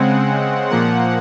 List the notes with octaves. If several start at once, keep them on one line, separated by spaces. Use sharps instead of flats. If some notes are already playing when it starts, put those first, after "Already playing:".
Already playing: C#3 G#3 C4 F#5
A#2 F3 A#3 F#5